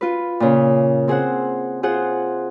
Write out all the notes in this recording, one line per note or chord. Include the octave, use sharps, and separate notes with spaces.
F4 B4
A#2 C#3
C4 G#4 C5 F#5
F4 G#4 C5 F#5